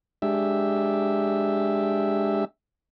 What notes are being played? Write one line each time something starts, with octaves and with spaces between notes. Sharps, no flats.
G#3 D4 G4 E5